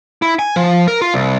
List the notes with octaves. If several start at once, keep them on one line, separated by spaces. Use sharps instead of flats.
E4
G#5
F3
A#4
F4
C2